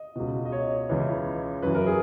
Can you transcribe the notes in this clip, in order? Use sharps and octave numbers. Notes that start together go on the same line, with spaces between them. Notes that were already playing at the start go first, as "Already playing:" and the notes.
Already playing: D#5
C#2 B2
D#5
C#5
C#2 C#3 E3
F#2 E3 B4
A#4
G#4